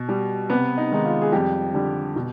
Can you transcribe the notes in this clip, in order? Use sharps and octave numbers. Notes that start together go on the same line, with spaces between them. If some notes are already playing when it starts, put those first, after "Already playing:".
Already playing: B2
G3
C3 B3 B4
D#4
D#3 G#3 D#4
F4
G#4
F2 G3 G4
D3 G3
B2